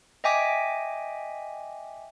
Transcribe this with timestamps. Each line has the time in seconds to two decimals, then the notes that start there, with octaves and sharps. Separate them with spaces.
0.24 D#5 E5 G5 G#5 D6 B6